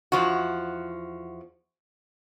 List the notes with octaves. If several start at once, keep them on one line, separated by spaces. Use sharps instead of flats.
E2 F3 F#4